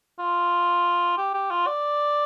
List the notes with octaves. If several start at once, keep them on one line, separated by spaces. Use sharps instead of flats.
F4
G4
G4
F4
D5